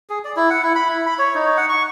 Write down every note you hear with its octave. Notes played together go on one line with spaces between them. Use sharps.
G#4
D5
E4
F#5
E4
B5
E4
B5
C#5
D#4
F#5
C#6